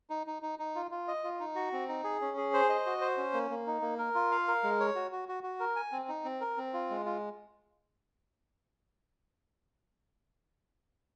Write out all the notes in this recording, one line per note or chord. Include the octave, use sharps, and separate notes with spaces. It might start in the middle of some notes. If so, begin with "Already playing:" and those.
D#4
D#4
D#4
D#4
F4
F4
D#5
F4
D#4
F#4
C4
D#4
G#4
C#4
G#4
C5
D#5
F#4
C5
C#4
A#3
A#3
D#4
A#3
A#4
F4
F5
A#4
G#3
C#5
F#4
F#4
F#4
F#4
A#4
G#5
C4
D#4
C4
A#4
C4
F4
G#3
F4